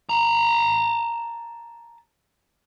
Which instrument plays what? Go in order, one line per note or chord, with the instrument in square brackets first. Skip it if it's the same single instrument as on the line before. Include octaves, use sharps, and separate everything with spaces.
[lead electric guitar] A5 A#5